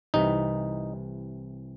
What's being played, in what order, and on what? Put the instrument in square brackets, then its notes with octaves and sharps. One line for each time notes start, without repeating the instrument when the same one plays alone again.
[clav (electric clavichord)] C2 C3 E3 D#4